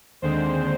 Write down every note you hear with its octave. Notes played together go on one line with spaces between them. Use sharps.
D#2 D3 G#3 C4 C5